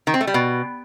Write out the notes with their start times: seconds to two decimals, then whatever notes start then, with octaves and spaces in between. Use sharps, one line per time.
0.07 D#3
0.14 C4
0.21 A3
0.27 G3
0.34 B2